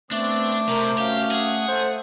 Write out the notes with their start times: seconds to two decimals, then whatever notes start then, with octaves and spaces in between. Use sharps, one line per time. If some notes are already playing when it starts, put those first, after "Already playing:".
0.11 A3 B3 C4 D4 D5 D6
0.69 C3 A#4 C5
0.98 C#4 F#4 G4 F5
1.31 G#4 F#5
1.68 A3 C5